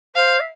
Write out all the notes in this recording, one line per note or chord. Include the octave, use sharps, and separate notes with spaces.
C5 F5
E5